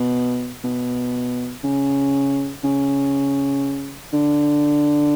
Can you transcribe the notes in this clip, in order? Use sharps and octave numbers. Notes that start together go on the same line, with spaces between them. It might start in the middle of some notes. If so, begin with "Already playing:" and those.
Already playing: B2
B2
C#3
C#3
D3